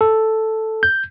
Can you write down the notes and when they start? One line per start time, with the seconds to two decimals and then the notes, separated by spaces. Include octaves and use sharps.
0.01 A4
0.83 G6